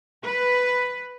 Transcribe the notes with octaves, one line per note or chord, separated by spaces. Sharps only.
B4